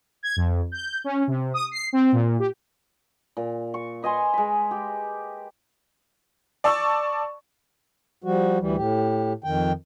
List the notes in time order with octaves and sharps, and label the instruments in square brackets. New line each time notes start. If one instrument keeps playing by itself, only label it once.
[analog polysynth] G#6
F2
G6
C#4
C3
D#6
C7
C4
A#2
G4
[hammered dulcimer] A#2
C#6
B4 D#5 G#5 C6
G#3 B5
G4
[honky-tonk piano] D5 A5 C#6 E6
[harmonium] F3 G3 F#4
D2 E3 G3
A2 G4
F2 D#3 G5